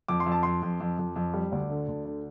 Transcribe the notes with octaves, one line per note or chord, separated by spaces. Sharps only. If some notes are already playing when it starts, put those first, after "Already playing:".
F2 D6
C6
F2
A5
F2 C6
F2
F2
F2
F2
G3
D2 D5
D3
D2
D3